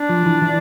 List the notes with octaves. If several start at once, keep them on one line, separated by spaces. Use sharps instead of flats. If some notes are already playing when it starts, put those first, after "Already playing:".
Already playing: D4
F3
E3
E3